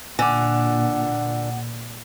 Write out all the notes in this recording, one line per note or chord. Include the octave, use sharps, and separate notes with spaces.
A#2 D3 F#5 G#5 D6